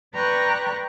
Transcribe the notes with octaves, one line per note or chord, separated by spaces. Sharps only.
B4 D5 G5 A#5 C#6 F#6